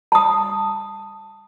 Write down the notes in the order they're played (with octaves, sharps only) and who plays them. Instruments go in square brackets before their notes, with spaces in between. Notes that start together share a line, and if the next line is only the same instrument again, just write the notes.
[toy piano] A5 D#6